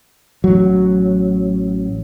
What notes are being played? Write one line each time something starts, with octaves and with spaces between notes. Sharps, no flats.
A1 F#3